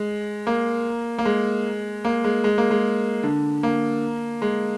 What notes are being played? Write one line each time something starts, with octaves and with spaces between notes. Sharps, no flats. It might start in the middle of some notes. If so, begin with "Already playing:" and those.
Already playing: G#3
A#3
A#3
G#3
A#3
G#3
G#3
A#3
G#3
D3
A#3
G#3